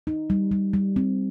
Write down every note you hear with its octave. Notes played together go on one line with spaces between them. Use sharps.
D#4
G3
G3
G3
C4